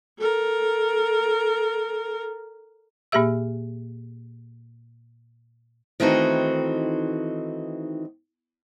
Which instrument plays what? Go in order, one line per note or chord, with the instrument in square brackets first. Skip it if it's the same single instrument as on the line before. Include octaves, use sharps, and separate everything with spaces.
[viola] A4 A#4
[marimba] A#2 A#3 G4 G#4 E5 E6
[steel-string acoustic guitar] D#3 E3 A3 C4 D#4 F#4